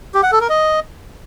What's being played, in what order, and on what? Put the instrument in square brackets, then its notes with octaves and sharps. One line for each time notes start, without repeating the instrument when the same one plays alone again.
[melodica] G4
F#5
A4
A#4
D#5